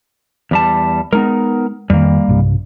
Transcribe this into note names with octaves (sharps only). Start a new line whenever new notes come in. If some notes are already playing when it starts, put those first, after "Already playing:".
E2 G3 A5
G#3 B3 D#4 A#4
F2 D#3 G3 A#3
B1 G2 C3